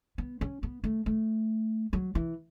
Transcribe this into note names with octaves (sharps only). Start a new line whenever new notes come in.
B3
C#4
B3
A3
A3
F#3
E3